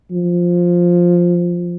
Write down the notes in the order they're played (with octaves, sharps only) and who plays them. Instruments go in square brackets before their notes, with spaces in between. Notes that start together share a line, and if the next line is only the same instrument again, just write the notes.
[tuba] F3